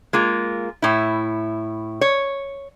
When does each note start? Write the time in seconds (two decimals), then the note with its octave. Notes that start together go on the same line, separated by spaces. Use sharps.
0.13 G#3 A#3 F4
0.82 A2 E4
2.01 C#5